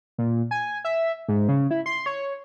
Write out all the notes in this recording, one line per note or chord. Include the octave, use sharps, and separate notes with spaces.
A#2
G#5
E5
G#2
C#3
E4
C6
C#5